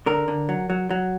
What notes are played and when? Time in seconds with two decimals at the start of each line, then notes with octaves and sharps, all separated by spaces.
0.06 D3 A#4
0.28 D3
0.49 F#3
0.70 F#3
0.91 F#3